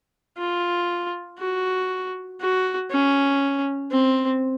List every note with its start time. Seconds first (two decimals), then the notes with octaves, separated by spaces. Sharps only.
0.38 F4
1.38 F#4
2.41 F#4
2.90 C#4
3.92 C4